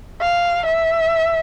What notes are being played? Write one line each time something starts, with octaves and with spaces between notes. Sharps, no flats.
F5
E5